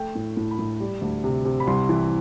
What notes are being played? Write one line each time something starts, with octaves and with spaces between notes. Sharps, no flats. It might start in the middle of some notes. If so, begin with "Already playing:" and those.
Already playing: A3 G5
A2
A2
B5
A2
G3
D2
C3
C3
B5
C2 C6
E3